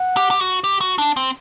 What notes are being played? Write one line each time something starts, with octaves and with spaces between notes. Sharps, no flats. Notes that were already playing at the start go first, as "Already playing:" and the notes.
Already playing: F#5
G4
G4
F#4
G4
F#4
D4
C4